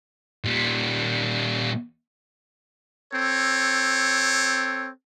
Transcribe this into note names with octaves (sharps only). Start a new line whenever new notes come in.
A#2 G3
C4 A4 C#5